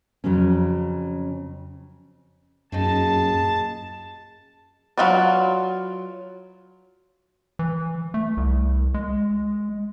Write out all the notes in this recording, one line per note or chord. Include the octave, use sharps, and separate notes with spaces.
F2 C#3 F#3 C#4
F#2 A#2 D#4 G#4 A5
F#3 D#4 F4 B4 D5
E3
A3
C2
G#3